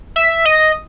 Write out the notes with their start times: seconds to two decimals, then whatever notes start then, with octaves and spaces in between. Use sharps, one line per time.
0.16 E5
0.45 D#5